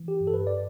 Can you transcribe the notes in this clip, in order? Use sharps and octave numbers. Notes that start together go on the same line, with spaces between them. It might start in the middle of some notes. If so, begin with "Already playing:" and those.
Already playing: E3
G4
G2
A4
B4
D5